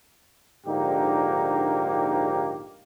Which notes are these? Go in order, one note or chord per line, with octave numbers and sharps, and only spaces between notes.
A#1 G#2 D3 A#3 D#4 G4